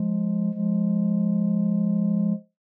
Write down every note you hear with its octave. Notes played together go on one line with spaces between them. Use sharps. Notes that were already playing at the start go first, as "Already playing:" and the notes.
Already playing: F3 G#3
F3 G#3